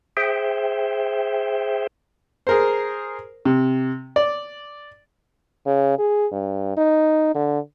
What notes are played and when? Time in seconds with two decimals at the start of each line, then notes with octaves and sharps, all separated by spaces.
0.17 G#4 C5 E5 G5
2.47 G#4 A#4 C5
3.45 C3
4.16 D5
5.66 C#3
5.99 G#4
6.32 G2
6.77 D#4
7.35 D3